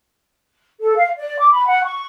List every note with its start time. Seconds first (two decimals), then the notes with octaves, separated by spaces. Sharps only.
0.81 A4
0.96 F5
1.17 D5
1.39 D6
1.53 B5
1.68 F#5
1.84 C#6